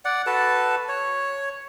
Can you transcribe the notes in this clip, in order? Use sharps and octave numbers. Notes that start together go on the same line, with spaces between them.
D5 F#5
F#4 A4 B4 A5
C#5